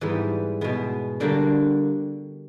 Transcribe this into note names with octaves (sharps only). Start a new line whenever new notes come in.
G#2 E3 G3 B3
B2 G#3 B3
D3 G3 A#3 D4 F#4